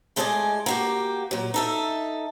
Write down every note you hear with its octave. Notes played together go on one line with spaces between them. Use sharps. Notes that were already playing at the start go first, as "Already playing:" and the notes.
A2 G#3 A4 D5 D#5 G#5
A#3 F#4 G4
A#2 F#3
D#4 A4 E5